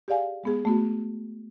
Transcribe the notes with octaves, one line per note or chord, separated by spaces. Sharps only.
G4 G#4 D5 F5 G#5
G#3 B3 G#4
A3 B3 F#4